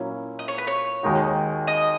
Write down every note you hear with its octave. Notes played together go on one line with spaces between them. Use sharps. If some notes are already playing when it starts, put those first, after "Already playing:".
Already playing: A#2 F#3 A#3 C#4 E4
D#5
C#5
B4
C#5
D#2 D#3 G#3 D#4 F#4
D#5